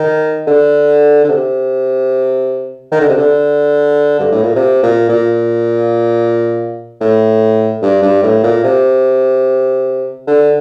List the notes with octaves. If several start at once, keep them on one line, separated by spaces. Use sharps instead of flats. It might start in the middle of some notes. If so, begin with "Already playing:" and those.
Already playing: D#3
D3
D3
C3
D#3
D3
C3
D3
G2
A2
A#2
C3
A#2
A#2
A2
G2
G2
A2
A#2
C3
D3